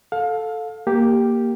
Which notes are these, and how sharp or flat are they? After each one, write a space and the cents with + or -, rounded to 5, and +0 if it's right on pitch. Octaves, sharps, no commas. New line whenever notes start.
A4 +0 F5 +25
A#3 +0 G4 +0